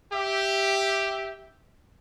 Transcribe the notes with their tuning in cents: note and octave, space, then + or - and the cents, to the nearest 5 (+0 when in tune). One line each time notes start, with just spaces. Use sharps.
G4 +0 E5 +0